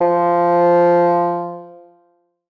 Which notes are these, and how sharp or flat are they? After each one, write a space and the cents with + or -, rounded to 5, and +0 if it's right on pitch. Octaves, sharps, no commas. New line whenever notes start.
F3 -10